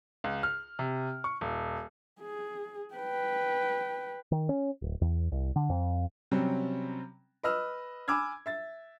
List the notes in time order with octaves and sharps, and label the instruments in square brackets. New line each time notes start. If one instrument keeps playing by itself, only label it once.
[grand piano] C#2
F6
C3
C#6
D#1
[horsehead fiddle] G#4
B4 G5
[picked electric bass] D#3
C#4
D1
E2
C2
D3
F2
[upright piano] C3 F#3 G3 C4 C#4
B4 D#5 E6 F6
G#5 B5 D6 E6 F6 G#6
E5 A6